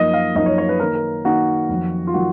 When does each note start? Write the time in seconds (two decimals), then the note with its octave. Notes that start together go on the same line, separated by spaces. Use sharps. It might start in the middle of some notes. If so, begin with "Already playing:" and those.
Already playing: F#2 F3 A#3 D#4 D#5
0.13 F5
0.35 F#2 F3 A#3 D#4 D#5
0.46 C#5
0.58 C#5
0.69 B4
0.80 D#3 A#3 D#4 A#4
0.95 A#4
1.25 D#3 A#3 D#4 F#4
1.69 F2 D#3 F#3
2.07 F4
2.14 D#3 F#3 F#4